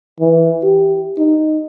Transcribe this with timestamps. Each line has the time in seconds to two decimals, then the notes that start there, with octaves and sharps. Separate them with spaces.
0.21 E3
0.63 G4
1.18 D#4